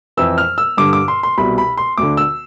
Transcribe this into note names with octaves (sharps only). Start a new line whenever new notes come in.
F2 E3 E6
F6
E6
G2 D3 D6
D6
C6
C6
C2 B2 B5
B5
C6
D2 D3 D6
E6